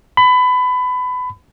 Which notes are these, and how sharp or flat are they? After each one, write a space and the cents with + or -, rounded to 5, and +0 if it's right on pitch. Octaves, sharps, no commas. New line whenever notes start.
B5 +25